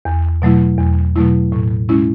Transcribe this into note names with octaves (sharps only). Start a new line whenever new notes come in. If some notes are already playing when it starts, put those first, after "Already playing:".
E2
B2 F#3 A3 E4
E2
B2 F#3 A3 E4
A2
G#3 C#4 E4